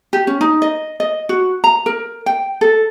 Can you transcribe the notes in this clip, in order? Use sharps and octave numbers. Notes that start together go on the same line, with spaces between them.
G4
C#4
D#4
D#5
D#5
F#4
A#5
A#4
G5
A4